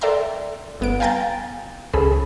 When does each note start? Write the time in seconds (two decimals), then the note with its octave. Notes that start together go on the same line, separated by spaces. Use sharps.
0.01 A4 D5 E5 G5 A#5 C6
0.80 G1 B3 D7
1.00 F5 G5 G#5 A#5 G6 A6
1.93 C#2 C#4 G#4 A4 B5